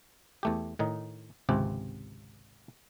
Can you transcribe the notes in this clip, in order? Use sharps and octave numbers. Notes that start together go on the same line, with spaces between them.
E2 A3 G4
A2 D#3 D#4
G#1 C#2 C3 C4 G4